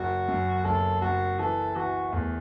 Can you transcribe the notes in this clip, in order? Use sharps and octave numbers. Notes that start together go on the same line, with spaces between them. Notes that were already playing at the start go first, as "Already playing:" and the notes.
Already playing: F#1 F#4
F#2
F#1 A4
F#1 F#4
E3 A4
E3 F#4
E2 A3